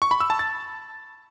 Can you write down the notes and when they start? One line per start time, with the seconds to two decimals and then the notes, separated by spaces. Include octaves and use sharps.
0.02 C#6
0.11 B5
0.20 E6
0.30 A5
0.39 A6